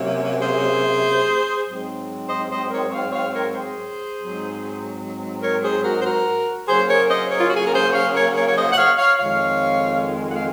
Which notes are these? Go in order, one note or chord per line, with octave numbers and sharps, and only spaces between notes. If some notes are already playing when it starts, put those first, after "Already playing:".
Already playing: C3 F#3 A#3 C#4
G#4 C5
G#2 F#3 C4
C5 D#5
C5 D#5
A#4 C#5
C#5 F5
C#5 F5
A#4 C#5
G#4 C5
G#2 F#3 C4
A#4 C#5
G#4 C5
F#4 A#4
C5
F#4 A#4
C#3 F#3 A#3 C#4 G#4 C5
A#4 C#5
C5 D#5
A#4 C#5
F4
F#4
G#4
A#4
G#4 C5
C#5 F5
A#4 C#5
A#4 C#5
C#5
C5 D#5
F#5
C#5 F5
C#5 F5
F2 D#3 G#3 C4 C#5 F5
F#5
F5